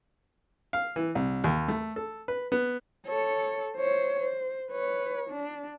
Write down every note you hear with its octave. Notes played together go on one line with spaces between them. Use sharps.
F5
E3
C2
D#2
A3
A4
B4
B3
A4 C#5
C5 C#5
C5
B4 C#5
D4